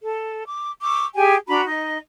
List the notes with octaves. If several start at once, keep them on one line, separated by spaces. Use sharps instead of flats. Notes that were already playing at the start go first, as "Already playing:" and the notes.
A4
D6
C#6 D6 E6
G4 G#4 G5 G#5
D4 F#4 A#5 B5
D#4 D#5